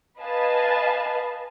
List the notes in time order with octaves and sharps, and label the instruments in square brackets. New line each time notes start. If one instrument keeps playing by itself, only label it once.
[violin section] B4 D#5 F5 G#5 A5